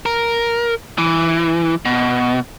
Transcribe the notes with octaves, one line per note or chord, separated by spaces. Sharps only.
A#4
E3
B2